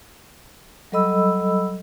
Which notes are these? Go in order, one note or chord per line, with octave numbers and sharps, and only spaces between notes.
F#3 G3 A4 D#5 B5 E6